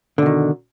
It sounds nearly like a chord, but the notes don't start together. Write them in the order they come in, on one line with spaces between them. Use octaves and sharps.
D3 B2 D#3